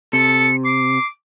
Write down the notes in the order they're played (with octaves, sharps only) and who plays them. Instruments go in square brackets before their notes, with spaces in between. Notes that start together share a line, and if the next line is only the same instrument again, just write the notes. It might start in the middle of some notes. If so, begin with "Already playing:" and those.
[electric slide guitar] C3 [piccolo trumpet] A4 [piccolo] C#7
[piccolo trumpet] D6 [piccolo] C7